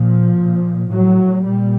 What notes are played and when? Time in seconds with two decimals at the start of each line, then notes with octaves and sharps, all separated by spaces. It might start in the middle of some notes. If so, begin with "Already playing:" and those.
Already playing: A#2 F3
0.38 A#2
0.90 A2 F#3
1.43 A#2 G3